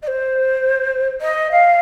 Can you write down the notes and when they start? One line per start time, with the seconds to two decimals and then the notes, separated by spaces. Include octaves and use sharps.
0.02 D#5
0.07 C5
1.21 D#5
1.51 F5